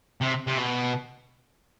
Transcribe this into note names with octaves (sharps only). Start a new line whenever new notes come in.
C3
C3
B2